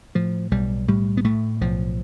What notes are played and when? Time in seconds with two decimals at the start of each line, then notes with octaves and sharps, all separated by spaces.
0.15 A2 F3
0.51 B1 G3
0.88 A2 G3
1.17 B3
1.24 A2 A3
1.61 B1 F3